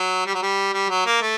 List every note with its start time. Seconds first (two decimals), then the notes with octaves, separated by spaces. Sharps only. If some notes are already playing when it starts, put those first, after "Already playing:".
Already playing: F#3
0.26 G3
0.34 F#3
0.42 G3
0.73 G3
0.89 F#3
1.06 A#3
1.21 A3